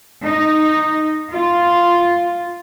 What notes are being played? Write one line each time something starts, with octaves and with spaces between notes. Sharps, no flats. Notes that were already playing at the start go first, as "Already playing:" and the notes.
D#4
F4